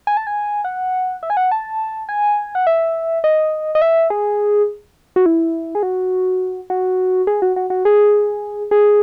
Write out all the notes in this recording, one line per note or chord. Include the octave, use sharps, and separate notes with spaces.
G#5
A5
G#5
F#5
E5
G#5
F#5
A5
G#5
F#5
E5
D#5
D#5
E5
G#4
F#4
E4
G#4
F#4
F#4
G#4
F#4
F#4
F#4
G#4
G#4